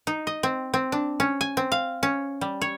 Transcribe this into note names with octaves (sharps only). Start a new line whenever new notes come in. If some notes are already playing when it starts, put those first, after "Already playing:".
D#4
D#5
C4
C4
D4
C#4
G#5
C4
F5
C#4
G3
C#5